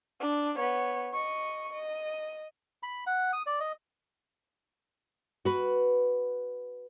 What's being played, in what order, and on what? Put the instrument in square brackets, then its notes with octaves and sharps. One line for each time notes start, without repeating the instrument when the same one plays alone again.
[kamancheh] D4
B3 C#5
D#5 C#6
D#5
[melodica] B5
F#5
D#6
D5
D#5
[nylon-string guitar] F#4 B4